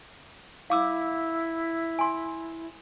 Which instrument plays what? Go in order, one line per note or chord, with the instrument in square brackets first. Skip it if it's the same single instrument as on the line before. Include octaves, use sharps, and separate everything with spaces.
[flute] E4 [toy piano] F5 D6 E6
[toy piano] G#5 C6